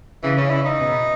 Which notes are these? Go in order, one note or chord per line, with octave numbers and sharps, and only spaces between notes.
C#3 E3
C#4
E4
D#4
B2